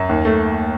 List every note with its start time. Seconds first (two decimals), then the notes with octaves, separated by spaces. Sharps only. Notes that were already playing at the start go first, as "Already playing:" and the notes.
Already playing: F#2
0.09 D#2
0.25 A3